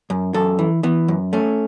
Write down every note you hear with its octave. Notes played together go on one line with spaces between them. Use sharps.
F#2
F#2 A4
E3
E3 B3
F#2
A3 C#4